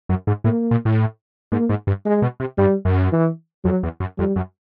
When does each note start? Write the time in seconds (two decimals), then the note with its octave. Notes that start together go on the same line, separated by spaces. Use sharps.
0.09 F#2
0.27 G#2
0.44 A2 A#3
0.71 A#2
0.85 A2
1.52 G#2 A#3
1.69 G#2
1.87 G2
2.05 G#3
2.22 B2
2.40 C3
2.58 G2 G3
2.85 F#2
3.12 E3
3.64 F2 F#3
3.83 E2
4.00 F#2
4.18 F2 G3
4.36 F#2